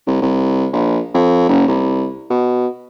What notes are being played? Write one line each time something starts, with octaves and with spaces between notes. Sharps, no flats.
C2
C2
A#1
F2
F#1
C2
B2